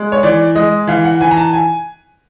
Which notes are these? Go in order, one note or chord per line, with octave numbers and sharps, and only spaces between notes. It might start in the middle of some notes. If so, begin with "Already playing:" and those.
Already playing: G#3
C#5
E3 D5
G#3 D#5
E3 F5
F#5
E3 G#5
A#5
A5
G#5